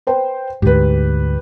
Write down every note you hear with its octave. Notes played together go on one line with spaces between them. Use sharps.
B4 C5 G5
D2 G#2 G4 B4